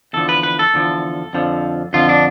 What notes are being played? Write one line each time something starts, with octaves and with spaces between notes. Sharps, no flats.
E2 D3 F3 A4
B4
B4
A4
E2 D3 F3
F2 D3 F3
F2 D3 F3 F4
D4